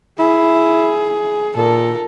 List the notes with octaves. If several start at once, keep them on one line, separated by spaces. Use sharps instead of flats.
E4 G#4
A#2 A4 A#4